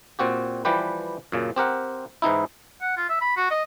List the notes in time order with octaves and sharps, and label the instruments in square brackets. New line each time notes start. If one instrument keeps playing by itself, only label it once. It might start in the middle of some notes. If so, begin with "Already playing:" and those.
[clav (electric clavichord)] A#2 C4 F#4 G4
E3 F3 G3 G4 B4
F#2 A#2 C#3
C4 G4 A#4 F#5
G#2 E3 D#4 E4
[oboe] F#5
F4
E5
B5
F#4
D#5